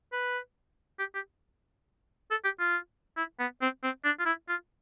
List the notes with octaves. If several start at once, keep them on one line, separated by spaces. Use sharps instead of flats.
B4
G4
G4
A4
G4
F4
E4
B3
C4
C4
D4
F4
E4
F4